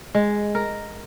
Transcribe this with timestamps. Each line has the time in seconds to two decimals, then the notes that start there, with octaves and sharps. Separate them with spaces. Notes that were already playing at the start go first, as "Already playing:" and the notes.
0.15 G#3
0.55 A#4